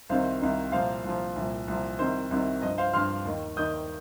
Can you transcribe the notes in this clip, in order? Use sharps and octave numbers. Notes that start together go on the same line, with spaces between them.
C2 C3 D#3 C5 F5
C2 C3 D#3
C2 A#2 F3 C5 F5
C2 A#2 F3
C2 A#2 F3
C2 A#2 F3
C2 C3 D#3 C5
C2 C3 D#3
G2 F3 D#5
C5 F5
G2 F3 C6 F6
D#2 D#3
D#2 D#3 D#6 G6